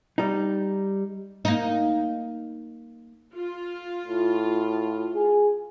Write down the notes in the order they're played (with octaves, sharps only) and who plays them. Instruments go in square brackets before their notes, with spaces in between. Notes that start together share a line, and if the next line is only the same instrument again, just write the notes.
[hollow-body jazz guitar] G3 D#4
[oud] A#3 D#4
[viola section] F4
[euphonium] A2
G#4